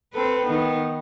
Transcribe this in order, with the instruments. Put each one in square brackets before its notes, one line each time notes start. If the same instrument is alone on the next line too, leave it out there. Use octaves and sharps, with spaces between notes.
[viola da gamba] C4 A4 B4
D#3 B3